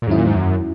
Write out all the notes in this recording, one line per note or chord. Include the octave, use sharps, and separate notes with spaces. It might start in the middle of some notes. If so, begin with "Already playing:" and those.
A#2
E2 G#2 D#3 F#3 C#4 E4
A#2
G#2
F#2